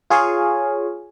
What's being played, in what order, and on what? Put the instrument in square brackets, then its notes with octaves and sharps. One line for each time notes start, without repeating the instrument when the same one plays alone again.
[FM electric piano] F4 G#4 C#5 F5 G#5